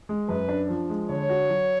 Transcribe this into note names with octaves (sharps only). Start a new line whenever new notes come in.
G#3
F#2 B4
D4
F3
G#3
D3 C#5
F#4
F#3